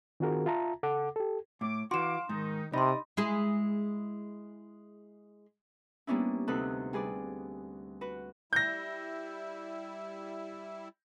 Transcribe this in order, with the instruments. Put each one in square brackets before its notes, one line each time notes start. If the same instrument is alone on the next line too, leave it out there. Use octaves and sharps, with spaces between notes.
[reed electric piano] D#3 C4 F4 F#4 G#4 A#4
F4 E5 A5 A#5
C#3 A4 F#5 D6
G4 A4
[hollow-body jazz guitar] A2 [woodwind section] D6
[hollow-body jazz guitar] E3 F#4 [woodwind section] F5 D6 [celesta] C6 E7
[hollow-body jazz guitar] G#2 [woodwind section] D#3 D#4
[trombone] C3 [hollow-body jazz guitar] D#4 [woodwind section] G4 D5 D#6 [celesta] B5 C6
[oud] G#3 E4 G#4
[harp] G3 A#3 B3 C#4 D4 E4
D2 C3 D#4 A4 B4 F#6
G3 G#4 B4 D5
F#4 B4
[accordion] G3 E4 [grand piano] G6 A#6